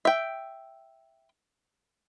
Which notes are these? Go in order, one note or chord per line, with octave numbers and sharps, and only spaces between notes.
E5 G5